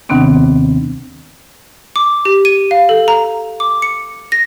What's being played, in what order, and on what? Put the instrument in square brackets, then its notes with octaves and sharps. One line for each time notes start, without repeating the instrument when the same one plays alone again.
[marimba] D#2 C3 D#3 B3 C4 D4
[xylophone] D6
G4
D#7
F5
A4
A#5
D6
C#7
A#6